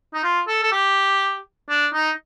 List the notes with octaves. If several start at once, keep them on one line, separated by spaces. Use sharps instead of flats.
D#4
F4
A4
A4
G4
D4
D#4